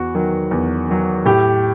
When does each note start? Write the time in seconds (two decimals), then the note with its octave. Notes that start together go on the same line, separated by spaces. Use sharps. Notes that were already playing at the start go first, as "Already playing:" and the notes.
Already playing: E2 F#4
0.15 D#3 F#3
0.51 E2
0.89 D#3 F#3
1.25 A2 G4